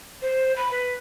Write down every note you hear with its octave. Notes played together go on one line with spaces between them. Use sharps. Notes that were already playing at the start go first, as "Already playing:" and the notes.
C5
B5
B4